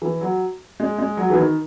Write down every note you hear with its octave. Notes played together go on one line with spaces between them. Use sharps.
E3
F#3
G#3
G#3
F#3
E3
D#3